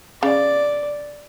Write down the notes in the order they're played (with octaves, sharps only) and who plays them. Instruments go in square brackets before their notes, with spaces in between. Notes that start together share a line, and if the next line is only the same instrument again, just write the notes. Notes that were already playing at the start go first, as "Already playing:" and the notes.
[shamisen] C#3 [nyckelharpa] D5